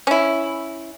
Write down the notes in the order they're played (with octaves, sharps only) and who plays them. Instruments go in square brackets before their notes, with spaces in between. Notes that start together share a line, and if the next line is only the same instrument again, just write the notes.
[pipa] C#4 E4